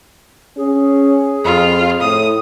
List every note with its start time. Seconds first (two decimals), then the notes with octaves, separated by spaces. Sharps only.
0.57 C#4 G#4
1.45 F2 F4
2.01 A2 D#6